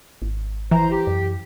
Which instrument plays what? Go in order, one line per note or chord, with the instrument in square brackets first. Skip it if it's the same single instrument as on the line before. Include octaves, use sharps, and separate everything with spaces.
[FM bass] G#1
[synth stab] E3 [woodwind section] C5 A#5
[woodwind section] G4
[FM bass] F#2